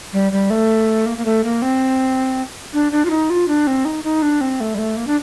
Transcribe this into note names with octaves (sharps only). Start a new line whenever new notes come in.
G3
G3
A3
A#3
A#3
A3
A#3
C4
D4
D4
F4
D#4
F4
D4
C4
D#4
D#4
D4
C4
A3
G3
A3
A#3
D4